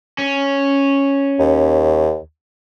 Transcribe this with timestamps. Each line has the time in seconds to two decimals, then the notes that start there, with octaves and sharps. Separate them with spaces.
0.18 C#4
1.39 D#2